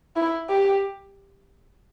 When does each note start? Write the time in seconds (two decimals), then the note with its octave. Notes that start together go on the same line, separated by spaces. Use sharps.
0.16 E4
0.49 G4